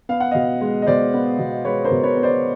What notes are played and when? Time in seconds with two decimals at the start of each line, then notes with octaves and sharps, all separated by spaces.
0.09 B3 F5
0.20 F#5
0.31 B2 D#5 F5
0.61 G#3
0.82 D#5
0.87 B2 C5 D5
1.14 B3
1.39 B2
1.65 G#3 B4 C#5
1.85 A#4 C5
1.91 B2
2.03 B4 C#5
2.16 B3
2.23 C5 D5